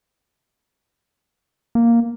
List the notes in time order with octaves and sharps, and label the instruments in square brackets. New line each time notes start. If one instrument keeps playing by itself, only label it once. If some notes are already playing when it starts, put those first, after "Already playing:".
[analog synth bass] A#3